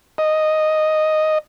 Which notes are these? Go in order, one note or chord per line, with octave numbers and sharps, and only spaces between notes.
D#5